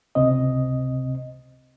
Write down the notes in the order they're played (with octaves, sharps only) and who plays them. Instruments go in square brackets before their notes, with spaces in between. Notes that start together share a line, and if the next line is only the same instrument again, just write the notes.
[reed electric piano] C#2 C3 C4 D#5